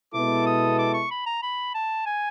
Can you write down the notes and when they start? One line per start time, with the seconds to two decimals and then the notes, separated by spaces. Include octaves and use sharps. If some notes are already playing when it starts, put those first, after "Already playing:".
0.14 B2 G#3 B3 E4 A4 D6
0.46 D#6
0.79 D6
0.94 C#6
1.10 B5
1.26 A#5
1.43 B5
1.74 A5
2.06 G#5